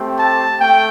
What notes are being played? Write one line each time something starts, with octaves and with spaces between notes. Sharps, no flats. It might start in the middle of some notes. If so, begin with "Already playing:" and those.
Already playing: A3 C4 G4
A5
A3 G5